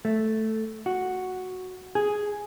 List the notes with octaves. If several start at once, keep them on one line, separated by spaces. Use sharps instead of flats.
A3
F#4
G#4